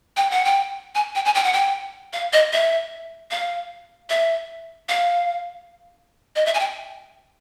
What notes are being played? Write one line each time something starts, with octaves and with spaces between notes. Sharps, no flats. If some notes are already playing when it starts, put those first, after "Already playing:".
G5
F#5
G5
G#5
G5
G#5
G5
F#5
G5
F5
D#5
E5
F5
E5
F5
D#5
E5
G#5
G5